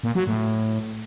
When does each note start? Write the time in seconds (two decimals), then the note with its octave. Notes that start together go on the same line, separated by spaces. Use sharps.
0.03 A#2
0.15 F#3
0.27 A2